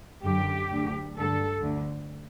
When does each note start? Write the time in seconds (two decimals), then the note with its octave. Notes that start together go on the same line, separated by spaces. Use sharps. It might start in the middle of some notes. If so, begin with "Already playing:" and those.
0.23 F#2 D3 G4
0.70 D2 D3
1.16 G2 D3 A4
1.62 D2 D3